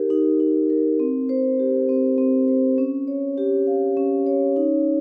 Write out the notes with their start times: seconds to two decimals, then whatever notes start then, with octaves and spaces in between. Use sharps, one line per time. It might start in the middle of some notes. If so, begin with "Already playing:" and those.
Already playing: D#4 G4 A#4
0.10 D#4
0.40 D#4
0.70 A#4
1.00 C4
1.29 C5
1.59 G4
1.89 C4
2.18 C4
2.48 C5
2.78 C#4
3.08 C#5
3.38 G4
3.67 F5
3.97 C#4
4.26 C#5
4.56 D#4